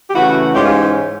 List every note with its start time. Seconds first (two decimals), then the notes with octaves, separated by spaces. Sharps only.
0.08 G4
0.13 C#3 E3 A3 E4 F#4
0.54 G#2 E3 G#3 C#4 F4 G4
0.65 F4 G4